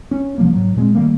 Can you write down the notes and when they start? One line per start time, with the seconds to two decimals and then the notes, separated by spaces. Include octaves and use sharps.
0.11 C#4
0.38 C3 F3 G3 A#3
0.53 G#2 F#3
0.76 A#2 G#3 C4
0.95 D#3 G3 A3 A#3